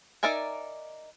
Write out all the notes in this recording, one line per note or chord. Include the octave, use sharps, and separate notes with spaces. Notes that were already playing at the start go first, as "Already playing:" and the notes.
D#4 A#4 D5 E5 G#5